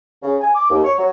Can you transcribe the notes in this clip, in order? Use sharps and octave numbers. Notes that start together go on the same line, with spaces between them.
C#3
G#5
D6
D#2
C#5
F#3